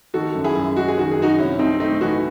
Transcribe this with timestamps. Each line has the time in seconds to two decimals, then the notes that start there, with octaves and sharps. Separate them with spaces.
0.14 D#3 F#4 A4
0.35 F#2
0.44 E4 G#4
0.56 F#2
0.76 G#3 F#4
0.88 G#4
0.98 D#3 F#4
1.11 G#4
1.18 F#2 D#4 F#4
1.38 C3 C#4 E4
1.59 C2 C4 D#4
1.80 A3 C4 D#4
2.01 E3 D#4 F#4